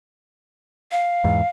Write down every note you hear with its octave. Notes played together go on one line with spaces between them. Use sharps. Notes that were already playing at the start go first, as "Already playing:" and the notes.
F5
E2 G#2